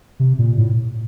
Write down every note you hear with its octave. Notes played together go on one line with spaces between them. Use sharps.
C3
A#2
A2